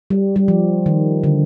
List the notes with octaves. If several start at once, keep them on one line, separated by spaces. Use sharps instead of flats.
G3
G3
F3
D#3
D3